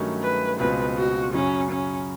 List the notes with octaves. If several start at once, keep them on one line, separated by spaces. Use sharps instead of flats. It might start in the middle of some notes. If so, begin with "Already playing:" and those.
Already playing: G2 D#3 F#3 A3 C#4
B4
C#2 B2 G#3 C4 F4 B4
F#4
F#2 C#3 F#3 C#4
C#4